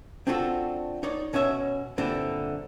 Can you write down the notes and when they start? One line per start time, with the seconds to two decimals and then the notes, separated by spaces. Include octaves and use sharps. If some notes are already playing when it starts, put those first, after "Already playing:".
0.27 C4 D4 F4 F#4 A4
1.03 D#4 C#5 D5
1.33 B2 C#4 F#4 C#5 E5
1.98 G2 A#2 D3 C4 E4